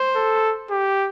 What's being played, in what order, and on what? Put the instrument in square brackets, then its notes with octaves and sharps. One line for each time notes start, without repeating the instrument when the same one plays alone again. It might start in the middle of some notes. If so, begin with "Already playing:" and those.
Already playing: [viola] C5
[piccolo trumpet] A4
G4